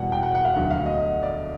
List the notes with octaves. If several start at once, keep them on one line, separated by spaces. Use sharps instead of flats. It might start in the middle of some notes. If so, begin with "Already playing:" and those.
Already playing: E2 B2 G3 F#5
G5
F#5
F#5
F5
D2 D3 F#3 F#5
F5
D#5
D5